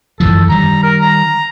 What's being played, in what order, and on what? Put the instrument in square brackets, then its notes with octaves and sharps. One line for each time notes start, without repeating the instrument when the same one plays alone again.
[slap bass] F#2 E3 F3 [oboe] A4
[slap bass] D#3 G3 [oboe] A#5
[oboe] A#4
A#5